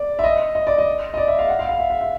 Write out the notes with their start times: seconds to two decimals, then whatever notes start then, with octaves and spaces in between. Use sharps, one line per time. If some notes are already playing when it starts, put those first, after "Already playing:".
Already playing: D5
0.19 E5
0.24 D#5
0.55 D#5
0.67 D5
0.78 D#5
1.14 D#5
1.17 D5
1.28 E5
1.39 F5
1.49 F#5
1.59 F5
1.69 F5
1.80 E5
1.90 E5
2.01 E5